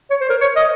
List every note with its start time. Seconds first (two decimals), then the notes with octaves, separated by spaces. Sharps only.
0.10 C#5
0.21 C5
0.30 A#4
0.41 C#5
0.56 D#5